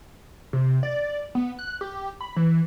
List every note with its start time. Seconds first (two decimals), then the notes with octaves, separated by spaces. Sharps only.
0.53 C3
0.83 D5
1.35 B3
1.59 F#6
1.81 G4
2.21 B5
2.37 E3